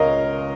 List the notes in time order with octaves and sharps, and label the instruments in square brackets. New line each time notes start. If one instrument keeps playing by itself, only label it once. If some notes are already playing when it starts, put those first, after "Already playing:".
Already playing: [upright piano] C#2 C#3 A#4 C#5 D#5 F5